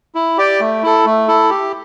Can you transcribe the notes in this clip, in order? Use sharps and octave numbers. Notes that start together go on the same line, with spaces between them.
E4
G4 D5 G5
A3
E4 A4
A3
E4 A4
G4